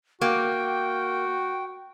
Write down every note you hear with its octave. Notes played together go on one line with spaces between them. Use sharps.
A#3 F#4 G5